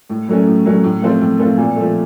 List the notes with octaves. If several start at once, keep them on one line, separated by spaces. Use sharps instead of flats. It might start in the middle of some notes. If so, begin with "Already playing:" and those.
A2
F#3 A3 C#4
A2
F#3 A3 C#4
A2
F3 A3 C4 F4
A2
F3 A3 C4 F4
A#2
F3 A3